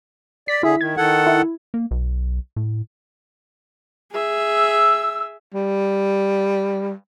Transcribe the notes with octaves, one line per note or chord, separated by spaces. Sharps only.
D5 B6
D3 E4 G#4
D#3 G#6
D#3 A4 F#5
E4
A#3
B1
A2
G#4 E5
E6
G3